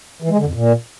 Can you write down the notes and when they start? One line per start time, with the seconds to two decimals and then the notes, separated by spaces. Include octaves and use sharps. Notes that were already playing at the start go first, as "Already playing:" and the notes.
0.22 E3
0.30 G#3
0.38 D3
0.46 F2
0.54 A#2